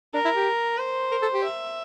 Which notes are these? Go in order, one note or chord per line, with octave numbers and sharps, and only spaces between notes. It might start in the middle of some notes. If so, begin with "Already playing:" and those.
D4 A#4
E4
G4
C5
A#4
A4
G4
E5